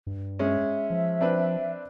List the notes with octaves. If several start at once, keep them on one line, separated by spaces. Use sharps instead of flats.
G2
G#3 C#4 E5
F3
C4 D4 B4